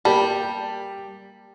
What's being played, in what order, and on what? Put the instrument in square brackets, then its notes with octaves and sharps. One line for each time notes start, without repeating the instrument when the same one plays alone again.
[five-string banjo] G3 [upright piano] A#3 G4 A5